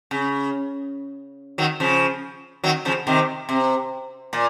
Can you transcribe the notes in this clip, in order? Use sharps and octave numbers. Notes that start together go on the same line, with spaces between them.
C#3
D#3 F#3
C#3 F3
D#3 F#3
C#3 F3
C3 D#3
C3
A#2